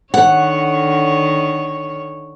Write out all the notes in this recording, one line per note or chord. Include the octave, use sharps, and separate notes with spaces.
D3 D#3 C#5 F#5